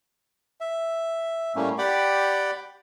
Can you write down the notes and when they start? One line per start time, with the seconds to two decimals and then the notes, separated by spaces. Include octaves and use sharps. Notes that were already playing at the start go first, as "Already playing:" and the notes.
0.61 E5
1.55 A2 G3 A3 A#3 C#4
1.78 G4 D5 F#5 G5 B5 D6